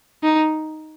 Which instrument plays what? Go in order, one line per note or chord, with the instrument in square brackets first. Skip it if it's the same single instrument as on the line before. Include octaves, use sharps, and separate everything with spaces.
[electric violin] D#4